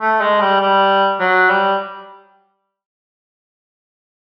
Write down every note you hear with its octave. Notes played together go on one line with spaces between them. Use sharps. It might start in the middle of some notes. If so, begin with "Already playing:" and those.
A3
G#3
G3
G3
F#3
G3